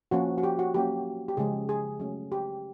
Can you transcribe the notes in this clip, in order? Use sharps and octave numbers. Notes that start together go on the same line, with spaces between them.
F3 A#3 C#4 F#4
F#4
G4
F#4
F#3 A#3 C#4 G4
G4
C#3 F3 G#3 C#4 G#4
G#4
F#3 A3 C#4
G4